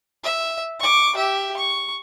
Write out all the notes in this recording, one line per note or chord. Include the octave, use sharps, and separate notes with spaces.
E5
C#6 D6
G4 E5
C#6